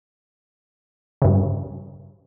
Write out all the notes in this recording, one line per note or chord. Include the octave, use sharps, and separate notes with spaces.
G2 C#3